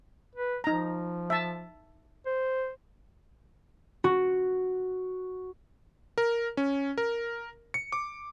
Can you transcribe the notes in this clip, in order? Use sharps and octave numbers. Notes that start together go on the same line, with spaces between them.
B4
F3 D#4 A#5
E5 A5
C5
F#4
A#4
C#4
A#4
C#7
D6